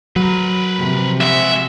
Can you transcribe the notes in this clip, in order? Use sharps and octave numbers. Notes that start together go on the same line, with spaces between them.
F#3 A#4 B4
C3 F3
G#3 F#4 E5